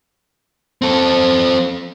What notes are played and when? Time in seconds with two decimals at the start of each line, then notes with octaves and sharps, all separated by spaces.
0.82 C4 A4